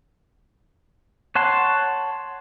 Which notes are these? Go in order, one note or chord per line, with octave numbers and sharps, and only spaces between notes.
C#5 F#5 A5 C6